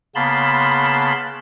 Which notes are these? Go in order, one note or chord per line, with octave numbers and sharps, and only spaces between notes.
C#3 A#3 B3 A5 B5 C6